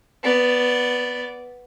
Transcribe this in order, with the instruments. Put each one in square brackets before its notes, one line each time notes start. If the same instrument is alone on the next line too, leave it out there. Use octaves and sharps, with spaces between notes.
[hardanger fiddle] B3 D5